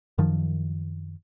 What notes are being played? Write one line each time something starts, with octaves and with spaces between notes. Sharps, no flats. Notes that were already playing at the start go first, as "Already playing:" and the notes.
F#2 D#3 F3